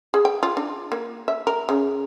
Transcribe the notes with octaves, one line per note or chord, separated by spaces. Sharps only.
G#4
G5
F4
D4
A#3
E5
A#4
C#3